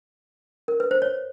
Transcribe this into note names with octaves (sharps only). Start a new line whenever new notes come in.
A#4
B4
C5
C#5